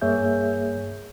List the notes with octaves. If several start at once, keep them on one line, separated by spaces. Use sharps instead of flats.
G2 A#3 G#4 C#5 E5 G6